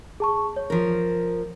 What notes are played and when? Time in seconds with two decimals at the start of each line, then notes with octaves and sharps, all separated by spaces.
0.20 G#4 A5 C#6
0.56 C#5
0.70 F3 A#4